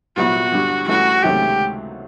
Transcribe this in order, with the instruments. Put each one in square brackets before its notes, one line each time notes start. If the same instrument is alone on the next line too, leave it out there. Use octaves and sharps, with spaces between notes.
[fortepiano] C2 A#2 F#3 B3 E4 [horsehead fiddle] F#4
[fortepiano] G2 D3 G3
[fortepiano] G2 E3 A3 C#4 E4 [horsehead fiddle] F#4
[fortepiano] C#2 C3 D#3 F#3 A3 [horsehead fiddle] G4